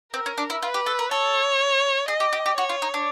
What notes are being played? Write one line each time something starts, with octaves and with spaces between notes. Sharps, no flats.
C4 A#4
C#4
D4
E4
F4 B4
G4
A4
A#4
A4 C#5
G#4 D#5
G4
G4
G4
F#4 C#5
F4
D#4
D4